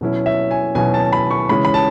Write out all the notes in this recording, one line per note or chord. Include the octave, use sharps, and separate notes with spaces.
B2 F#3 C#4 E4
E5
G#5
B2 F#3 C#4 E4 G#5
A5
B5
C#6
C#3 E3 G#3 C#4 B5
B5
A5